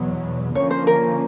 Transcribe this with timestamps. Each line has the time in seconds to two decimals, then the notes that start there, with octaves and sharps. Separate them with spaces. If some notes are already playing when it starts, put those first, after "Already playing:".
Already playing: E2 B2 F#3 B3
0.55 D3 F3 A#3 C#4 C#5
0.71 C5
0.87 A#4